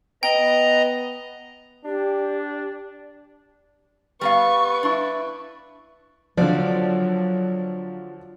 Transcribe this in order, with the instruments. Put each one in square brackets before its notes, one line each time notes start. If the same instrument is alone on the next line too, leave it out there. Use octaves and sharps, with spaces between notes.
[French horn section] B3 B4 [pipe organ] D#5 A#5 [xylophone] G5
[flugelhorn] D4 [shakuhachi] G4
[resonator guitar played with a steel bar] G3 B3 F5 [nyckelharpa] B4 [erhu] C#6
[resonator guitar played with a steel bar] D4 E4
[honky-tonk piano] D3 F3 [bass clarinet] F#3 [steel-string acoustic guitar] F4 F#4 D5